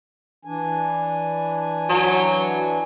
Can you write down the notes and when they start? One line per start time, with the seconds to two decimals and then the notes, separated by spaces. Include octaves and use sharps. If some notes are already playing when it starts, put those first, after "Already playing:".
0.45 E3 D4 G#5
1.90 F#3